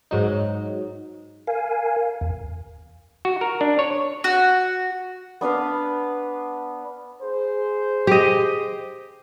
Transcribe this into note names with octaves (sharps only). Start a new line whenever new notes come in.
G#2 F#3 D#4
A#4 F5 G#5
E2
F#4
A#4
D4
C#5
F#4
B3 D4 B4 F5
G#4 C5
G4 D#5